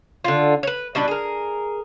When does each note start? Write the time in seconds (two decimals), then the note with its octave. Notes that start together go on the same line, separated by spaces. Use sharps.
0.24 D3 F4
0.63 B4 C#5
0.95 B2 G3 D4 B4
1.08 G#4 A#4